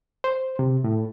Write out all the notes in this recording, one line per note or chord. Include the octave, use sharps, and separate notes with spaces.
C5
C3
A2